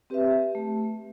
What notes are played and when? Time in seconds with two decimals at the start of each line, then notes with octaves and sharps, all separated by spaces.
0.10 C4 G4 B4 E5
0.55 A3